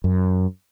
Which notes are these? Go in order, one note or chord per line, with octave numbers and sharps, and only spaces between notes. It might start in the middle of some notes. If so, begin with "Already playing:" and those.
F#2